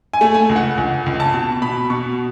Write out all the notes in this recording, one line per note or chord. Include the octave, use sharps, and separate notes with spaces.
G#5
A3
G#5
C#2
F#5
C#2
C#2
A5
B2
B2 B5
B2 C#6